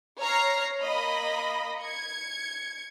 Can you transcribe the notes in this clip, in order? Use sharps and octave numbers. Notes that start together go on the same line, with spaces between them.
C#5 A#5 F6 C7
A#3 D#5 B5
G#6 C#7